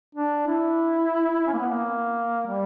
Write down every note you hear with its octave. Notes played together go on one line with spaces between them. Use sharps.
D4
E4
C#4
A#3
B3
A#3
G3